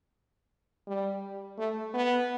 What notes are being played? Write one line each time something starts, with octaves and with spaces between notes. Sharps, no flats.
G3
A3
B3